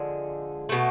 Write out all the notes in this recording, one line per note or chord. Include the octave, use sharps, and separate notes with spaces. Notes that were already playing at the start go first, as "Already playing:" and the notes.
Already playing: D3 F3 G#3
B2 A3